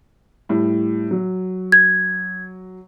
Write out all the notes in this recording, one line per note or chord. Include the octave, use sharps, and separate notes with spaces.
A2 G3
F#3
G#6